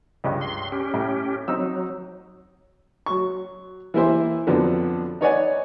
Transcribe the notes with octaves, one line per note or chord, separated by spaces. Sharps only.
C#2 G2
C6
C#4 G4
A2
F#3 C4 D#4 E6
F#3 C#6
E3 A#3 E4 G4 C5 E5
F2 D3 F3 F#3 B3
D#4 B4 C#5 D5 F#5 G#5